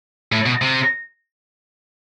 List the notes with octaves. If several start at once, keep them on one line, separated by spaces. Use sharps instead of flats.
A2
B2
C3